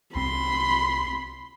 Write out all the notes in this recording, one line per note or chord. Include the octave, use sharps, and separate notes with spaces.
C2 C4 B5 C6